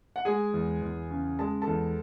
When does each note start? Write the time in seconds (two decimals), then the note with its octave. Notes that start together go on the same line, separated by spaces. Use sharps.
0.16 F#5
0.25 G#3 G#4 G#5
0.54 E2
0.82 E2
1.11 C#3
1.39 G#3 A5
1.61 A4 A5
1.67 E2